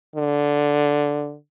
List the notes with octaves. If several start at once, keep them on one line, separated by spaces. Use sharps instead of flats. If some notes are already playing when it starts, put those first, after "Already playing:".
D3